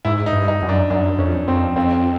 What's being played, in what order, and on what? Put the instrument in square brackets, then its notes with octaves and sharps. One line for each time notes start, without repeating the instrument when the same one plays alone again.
[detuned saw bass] G#2 [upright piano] E4
[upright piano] D#4
[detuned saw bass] G2
[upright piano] D#4
[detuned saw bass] F#2
[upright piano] D4
[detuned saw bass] F#2 [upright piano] D4
[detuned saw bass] F2 [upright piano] C#4
[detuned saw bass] F2 [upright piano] C4
[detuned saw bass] F2 [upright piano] C4